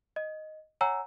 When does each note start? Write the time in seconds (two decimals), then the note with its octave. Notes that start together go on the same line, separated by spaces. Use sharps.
0.16 D#5
0.81 C#5 F#5 G#5 A#5 E6